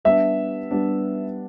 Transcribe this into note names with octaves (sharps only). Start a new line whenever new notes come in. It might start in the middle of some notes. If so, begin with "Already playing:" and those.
G3 B3 D4 E5
G3 B3 D4